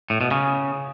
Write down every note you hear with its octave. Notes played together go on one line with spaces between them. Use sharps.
A2
B2
C#3